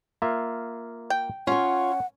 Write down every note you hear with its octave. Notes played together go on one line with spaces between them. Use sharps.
A#3 F4 E5
G5
C#4 F4 C#5 F#5